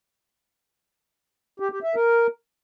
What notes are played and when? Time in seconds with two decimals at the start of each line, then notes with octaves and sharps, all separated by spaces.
1.60 G4
1.72 G4
1.83 E5
1.95 A#4